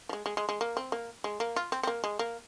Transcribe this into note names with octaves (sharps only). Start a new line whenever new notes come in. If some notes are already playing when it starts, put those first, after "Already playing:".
F3
G#3
G#3
G#3
G#3
A#3
C4
A#3
G#3
A#3
F4
C4
C4
A#3
G#3
A#3